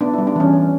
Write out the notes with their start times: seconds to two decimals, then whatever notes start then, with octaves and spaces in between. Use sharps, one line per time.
0.01 B3 D4
0.14 G3 E4
0.27 D4
0.36 E3 C#4
0.53 E3